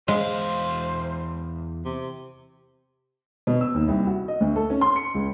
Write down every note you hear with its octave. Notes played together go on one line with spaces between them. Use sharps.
E2 G#3 C5 F5
C3
B2
E6
D#2
C2
F#4
D#5
D2
A4
C#4
C6
C#7
C#2